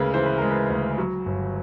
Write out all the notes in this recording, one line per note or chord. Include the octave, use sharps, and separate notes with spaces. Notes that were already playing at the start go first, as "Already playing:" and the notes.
Already playing: D2 C#3 G#3 A#4 B4
E3 C5
B4
G#3 A#4
B4
D2
F#3
G1